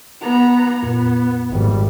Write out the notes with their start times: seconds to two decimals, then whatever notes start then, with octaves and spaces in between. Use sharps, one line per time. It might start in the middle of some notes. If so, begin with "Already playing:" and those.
0.21 B3 A#5
0.83 F2 A#2 B3
1.50 G#1 G3